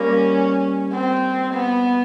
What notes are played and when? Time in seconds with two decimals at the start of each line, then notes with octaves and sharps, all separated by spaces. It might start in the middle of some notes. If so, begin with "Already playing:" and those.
Already playing: G3 A#3 C#4
0.92 C4
1.53 B3